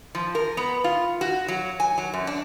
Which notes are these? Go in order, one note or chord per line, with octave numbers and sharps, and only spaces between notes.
F3
A#4
B3
F4
F#4
F#3
G#5
F#3
F#2
D4